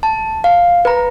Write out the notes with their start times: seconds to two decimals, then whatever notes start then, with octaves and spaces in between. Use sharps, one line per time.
0.03 A5
0.44 F5
0.85 B4 A#5